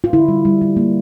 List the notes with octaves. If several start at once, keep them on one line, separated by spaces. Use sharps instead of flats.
F4
D3 E4
G3
G3
G3
A#3